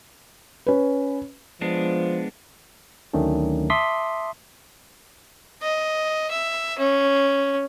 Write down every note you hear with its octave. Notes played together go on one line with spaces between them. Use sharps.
C#4 B4
F3 G#3 B3 D4
D2 D#3 F#3 A3 C#4 D4
E5 A5 C6 D6 D#6 B6
D#5
E5
C#4